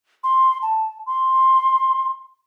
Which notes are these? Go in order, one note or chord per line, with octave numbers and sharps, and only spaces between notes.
C6
A5
C6